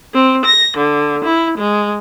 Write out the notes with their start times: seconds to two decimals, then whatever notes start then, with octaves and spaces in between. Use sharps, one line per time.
0.14 C4
0.45 A#6
0.76 D3
1.24 E4
1.57 G#3